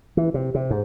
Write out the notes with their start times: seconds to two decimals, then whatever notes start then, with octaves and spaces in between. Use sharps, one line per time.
0.17 E3
0.34 C3
0.55 C3
0.71 G#2